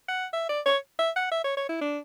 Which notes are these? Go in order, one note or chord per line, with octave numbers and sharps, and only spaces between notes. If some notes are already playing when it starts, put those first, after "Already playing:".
F#5
E5
D5
C#5
E5
F#5
E5
C#5
C#5
E4
D4